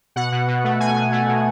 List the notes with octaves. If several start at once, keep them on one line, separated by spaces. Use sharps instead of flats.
B2 F#5
B2
B2
A3
B2 G#5
B2
A3
B2